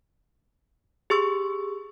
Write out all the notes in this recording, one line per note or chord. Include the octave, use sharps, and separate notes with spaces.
G4 G#4 C#6 E6